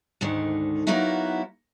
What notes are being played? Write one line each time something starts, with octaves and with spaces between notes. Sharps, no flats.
D2 G#2 D3 D#3
F#3 A#3 B3 D#4 E4 F#4